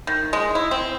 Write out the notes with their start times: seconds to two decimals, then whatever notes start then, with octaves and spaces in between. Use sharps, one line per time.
0.07 D#3
0.33 G#3
0.55 E4
0.71 C4